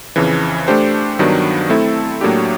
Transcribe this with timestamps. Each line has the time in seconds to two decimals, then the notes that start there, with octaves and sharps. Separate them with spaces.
0.16 F2 C#3 E3
0.68 A3 D4 G4 C5
1.19 G2 D#3 F#3 B3 D4
1.70 A3 C4 E4 A4
2.21 A2 F#3 A#3 D4 G4